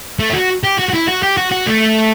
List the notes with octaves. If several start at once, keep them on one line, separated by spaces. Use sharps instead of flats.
A3
E4
F#4
G4
F#4
F#4
E4
F#4
G4
F#4
F#4
A3